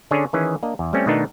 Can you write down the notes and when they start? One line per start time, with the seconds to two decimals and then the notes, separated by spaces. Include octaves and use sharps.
0.11 D3 C#4 D4 G#4 C#5
0.33 D#3 E3 C#4 G#4
0.63 A#3 D4 D#5
0.79 E2
0.93 G3 A3 C4 C#4
1.06 B2 D#3 A3 B3 D4 D#4